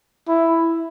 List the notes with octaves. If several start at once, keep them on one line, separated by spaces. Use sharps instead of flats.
E4